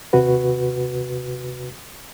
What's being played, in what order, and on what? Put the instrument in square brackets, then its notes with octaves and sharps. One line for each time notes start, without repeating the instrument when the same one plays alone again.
[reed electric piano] D#2 C3 F#4 B4